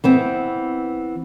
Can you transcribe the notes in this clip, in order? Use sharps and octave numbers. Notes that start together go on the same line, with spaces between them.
E3 B3 C4